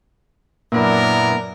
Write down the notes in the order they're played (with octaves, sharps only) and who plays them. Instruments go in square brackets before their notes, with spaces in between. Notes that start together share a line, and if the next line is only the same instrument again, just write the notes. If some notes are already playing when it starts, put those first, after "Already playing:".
[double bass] F#2 D4 [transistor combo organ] A#2 [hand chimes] A#3 [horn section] B3 E4 A#4